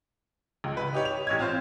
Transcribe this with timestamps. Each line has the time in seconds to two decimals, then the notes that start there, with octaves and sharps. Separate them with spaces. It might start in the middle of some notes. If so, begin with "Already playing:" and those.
0.64 C#2
0.77 B4
0.93 D#4 G4 C#5
1.05 F7
1.27 A1 C#5 G#6
1.39 C4 F4 C5